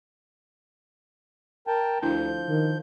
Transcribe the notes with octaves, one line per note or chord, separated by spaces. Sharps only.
A#4 G5 A5
D2 F3 D4 E4 G6
D#3